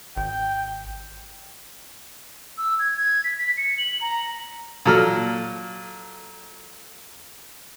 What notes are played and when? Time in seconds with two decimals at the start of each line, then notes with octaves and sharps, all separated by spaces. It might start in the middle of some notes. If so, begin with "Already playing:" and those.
0.17 G#1 G5
2.58 E6
2.79 G#6
2.97 G#6
3.24 B6
3.38 B6
3.57 C#7
3.78 F#7
4.01 A#5
4.86 A#2 F#3 A4 A#5 E6 F6